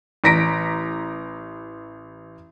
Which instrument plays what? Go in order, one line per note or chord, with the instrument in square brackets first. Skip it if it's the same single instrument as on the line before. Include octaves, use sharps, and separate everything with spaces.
[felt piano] A1 A#5 A#6 B6 D7